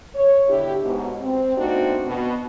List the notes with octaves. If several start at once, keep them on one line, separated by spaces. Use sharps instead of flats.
C#5
B2 D3 D4 E4 G4
G#2 B2
C4
A3 B3 C4 D4 D#4 F#4
B2